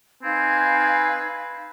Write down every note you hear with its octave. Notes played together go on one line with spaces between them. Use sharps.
C4 D#4 B4 F5 G#5 G#6